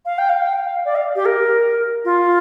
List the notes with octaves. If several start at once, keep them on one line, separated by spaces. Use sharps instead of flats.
F5
G5
F5
G5
F5
D5
F5
G4
A#4
F4